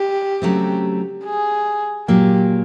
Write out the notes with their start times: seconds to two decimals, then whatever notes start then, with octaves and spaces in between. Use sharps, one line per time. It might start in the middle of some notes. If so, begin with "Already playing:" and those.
Already playing: G4
0.42 C#3 F#3 A3 C4
1.25 G#4
2.08 A#2 F#3 A#3 G4